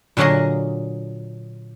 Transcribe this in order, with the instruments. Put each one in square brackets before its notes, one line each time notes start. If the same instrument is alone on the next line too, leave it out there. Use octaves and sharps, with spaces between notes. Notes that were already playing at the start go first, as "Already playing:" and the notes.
[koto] A#2 D3 F#3 A#3 G#4 D#5